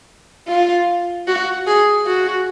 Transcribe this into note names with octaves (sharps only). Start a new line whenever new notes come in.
F4
F#4
G#4
F#4